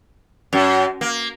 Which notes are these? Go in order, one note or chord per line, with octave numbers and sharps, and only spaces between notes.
F#2
A#3